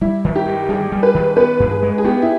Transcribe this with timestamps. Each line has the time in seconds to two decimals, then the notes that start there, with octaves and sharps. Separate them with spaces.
0.01 G3 E4
0.25 D#3
0.35 G4
0.46 G2
0.69 G3 G#4
0.92 G3
1.03 B4
1.15 D#3
1.36 B3 B4
1.60 G2
1.71 G#4
1.83 G#3
1.98 G#4
2.04 B3 G4
2.22 E4